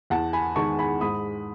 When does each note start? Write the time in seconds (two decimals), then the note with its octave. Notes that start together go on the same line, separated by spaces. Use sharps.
0.10 E2 F#5 A5
0.33 G#5 B5
0.56 D#3 G#3 A5 C#6
0.79 G#5 B5
1.01 G#2 B5 D#6